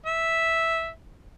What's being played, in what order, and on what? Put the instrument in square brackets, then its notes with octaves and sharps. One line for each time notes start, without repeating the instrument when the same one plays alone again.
[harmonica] E5